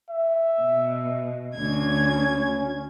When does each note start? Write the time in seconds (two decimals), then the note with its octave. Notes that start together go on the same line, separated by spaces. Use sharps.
0.10 E5
0.61 B2
1.55 D2 C#4 G#6